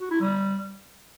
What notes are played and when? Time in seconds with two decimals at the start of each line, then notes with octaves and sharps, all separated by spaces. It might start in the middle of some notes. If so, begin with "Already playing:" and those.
0.01 F#4
0.11 E4
0.21 G3